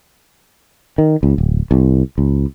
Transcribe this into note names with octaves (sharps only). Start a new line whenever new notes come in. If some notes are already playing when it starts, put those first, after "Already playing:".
D#3
C#2
D1
C2
C#2